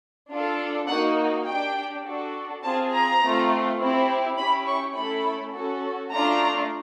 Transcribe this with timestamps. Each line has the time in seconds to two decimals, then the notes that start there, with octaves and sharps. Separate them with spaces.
0.30 D4 F4 A4
0.88 A#3 D#4 F#4 F#5
1.46 D4 G4 G5
2.04 D4 F#4 A4
2.63 C4 F4 G#4 A5
2.92 A#5
3.21 A3 C4 F4
3.79 C4 E4 G4
4.37 C#4 E4 G4 B5
4.66 C#6
4.95 A3 C#4 E4 A4 B5
5.54 C#4 F#4 A4
6.12 A3 D4 F4 A#5